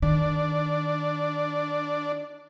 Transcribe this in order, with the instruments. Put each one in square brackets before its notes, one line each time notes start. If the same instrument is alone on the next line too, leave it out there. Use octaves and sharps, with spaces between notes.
[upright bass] D#3 [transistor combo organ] D4